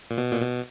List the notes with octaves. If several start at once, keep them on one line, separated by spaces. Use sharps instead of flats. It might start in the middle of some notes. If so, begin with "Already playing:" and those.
A#2
B2
A#2
B2